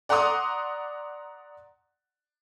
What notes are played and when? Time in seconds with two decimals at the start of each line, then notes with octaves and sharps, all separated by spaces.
0.09 D5 F#5 A#5 C6 D6 D#6